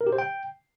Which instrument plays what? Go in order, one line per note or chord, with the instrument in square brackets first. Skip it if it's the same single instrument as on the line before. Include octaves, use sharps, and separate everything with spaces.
[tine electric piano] A#4
G4
C5
G5